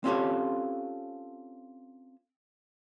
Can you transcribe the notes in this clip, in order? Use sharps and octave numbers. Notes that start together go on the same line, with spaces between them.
C4 C#4 F4 G4 A4 C#5